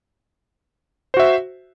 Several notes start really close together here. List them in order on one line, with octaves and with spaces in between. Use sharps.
C5 F#4 E5